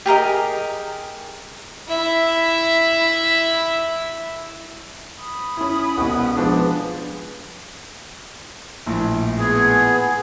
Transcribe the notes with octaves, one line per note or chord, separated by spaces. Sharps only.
G4 G#4 A#4 D#5
E4 E5
B5 D#6
C#4 E4
C2 B2 F#4 F#5
F3 G#3 B3 D4
A#1 A2
B3 G#4